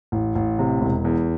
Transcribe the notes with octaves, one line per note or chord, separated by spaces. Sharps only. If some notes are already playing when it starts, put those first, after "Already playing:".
A1
A1
C3
E1
E2